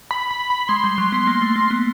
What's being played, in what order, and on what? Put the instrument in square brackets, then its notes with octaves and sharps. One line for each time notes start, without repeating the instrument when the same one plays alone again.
[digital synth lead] B5
B5
B5
[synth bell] G#3 [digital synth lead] C6
[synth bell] G3
F#3
B3
A#3
A3
A#3
B3